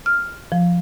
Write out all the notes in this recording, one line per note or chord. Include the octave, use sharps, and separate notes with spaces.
F6
F3